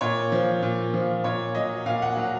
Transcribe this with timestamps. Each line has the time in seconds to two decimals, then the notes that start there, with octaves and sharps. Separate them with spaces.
0.01 A#2 C#5
0.32 F3
0.62 A#2
0.93 F3
1.24 A#2 C#5
1.55 F#3 D#5
1.86 A#2 F5
2.02 F#5
2.17 F#3